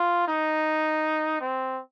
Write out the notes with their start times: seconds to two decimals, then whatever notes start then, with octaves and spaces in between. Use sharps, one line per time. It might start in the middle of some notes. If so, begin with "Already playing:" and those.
Already playing: F4
0.28 D#4
1.41 C4